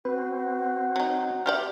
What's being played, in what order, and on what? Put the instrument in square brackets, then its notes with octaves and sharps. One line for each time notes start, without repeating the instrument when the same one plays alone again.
[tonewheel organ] C4 [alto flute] F#4 [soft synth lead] B4
[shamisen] F#3 D#4
[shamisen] G3 G4 D5 [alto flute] E5 [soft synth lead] F6